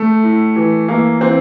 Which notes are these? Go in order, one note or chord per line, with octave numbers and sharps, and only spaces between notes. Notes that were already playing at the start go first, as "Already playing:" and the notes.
Already playing: A3
A2
E3
E3 A#3
E3 C4